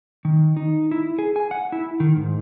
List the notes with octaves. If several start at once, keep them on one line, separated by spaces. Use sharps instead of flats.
D#3
D#4
E4
G#4
G#5
F#5
E4
D#3
G#2